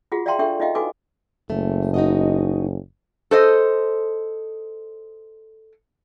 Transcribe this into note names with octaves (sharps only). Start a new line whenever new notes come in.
F4 F#4 G#4 F#5
D5 E5 F5 G5 A#5 C6
D4 G4 A4 E5 G5 C#6
D#4 F4 D#5 F5 G5
E4 F#4 A4 B4 G#5 D6
F#1 A3
D#4 F#4 D#5
A4 C5 D#5